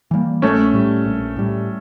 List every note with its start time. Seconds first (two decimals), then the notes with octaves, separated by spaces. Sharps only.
0.11 E3 G3 A#3
0.42 A#1 A3 C#4
0.74 A2 G3
1.05 A#1
1.36 A2 G3